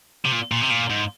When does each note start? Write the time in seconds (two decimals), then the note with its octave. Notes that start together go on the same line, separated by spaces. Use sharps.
0.25 C3
0.32 A#2
0.52 A#2
0.62 C3
0.70 A#2
0.90 G#2